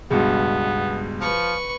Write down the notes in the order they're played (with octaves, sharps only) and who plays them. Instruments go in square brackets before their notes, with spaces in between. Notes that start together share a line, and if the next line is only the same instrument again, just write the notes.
[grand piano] C#2 G2 B2 [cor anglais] B3 [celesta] F#4 G#4
[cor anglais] F3 [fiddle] B4 C#6